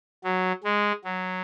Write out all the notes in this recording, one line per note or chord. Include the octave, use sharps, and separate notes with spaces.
F#3
G#3
F#3